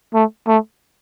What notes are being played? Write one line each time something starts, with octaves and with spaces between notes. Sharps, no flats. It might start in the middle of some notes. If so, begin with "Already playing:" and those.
A3
A3